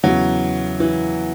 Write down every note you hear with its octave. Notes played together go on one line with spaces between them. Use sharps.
E2 C#3 E3 F#3
E3